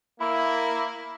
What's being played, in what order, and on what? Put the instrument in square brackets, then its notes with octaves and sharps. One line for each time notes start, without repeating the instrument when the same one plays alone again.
[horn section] A#3 E4